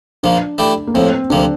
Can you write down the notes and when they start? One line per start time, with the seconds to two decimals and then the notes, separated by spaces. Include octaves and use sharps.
0.23 A#1 A#2 F3 A#3 D4
0.58 E3 A3 E4 G4 D5
0.87 A#3
0.94 A1 A2 F3 C4
1.30 D2 C3 F3 A#3 D4